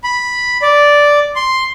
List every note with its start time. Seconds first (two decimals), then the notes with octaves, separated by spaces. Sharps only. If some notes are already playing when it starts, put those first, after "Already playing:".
0.04 B5
0.62 D5
1.36 C6